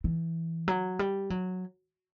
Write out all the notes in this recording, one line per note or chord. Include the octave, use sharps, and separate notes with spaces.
E3
F#3
G3
F#3